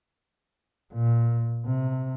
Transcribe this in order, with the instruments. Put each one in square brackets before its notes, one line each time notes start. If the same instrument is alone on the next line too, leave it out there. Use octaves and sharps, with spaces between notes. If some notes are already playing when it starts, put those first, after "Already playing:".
[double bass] A#2
C3